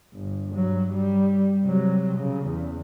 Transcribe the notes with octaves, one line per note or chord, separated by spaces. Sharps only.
G1
G2 F#3
G3
C3 F#3
C#3
E2